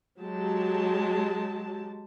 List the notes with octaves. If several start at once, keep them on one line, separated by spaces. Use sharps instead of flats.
F#3 G#3 G4 A5